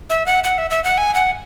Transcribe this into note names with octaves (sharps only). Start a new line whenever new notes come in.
E5
F#5
F#5
E5
E5
F#5
G#5
F#5